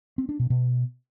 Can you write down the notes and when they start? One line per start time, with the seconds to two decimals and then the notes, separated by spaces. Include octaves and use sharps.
0.18 C4
0.29 D4
0.39 B2
0.50 B2